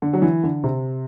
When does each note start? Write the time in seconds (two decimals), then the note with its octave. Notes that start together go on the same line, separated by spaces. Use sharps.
0.02 D3
0.13 F#3
0.22 E3
0.43 D3
0.64 C3